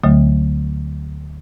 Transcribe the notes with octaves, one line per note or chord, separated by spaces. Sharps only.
D2 D3 F#3 A3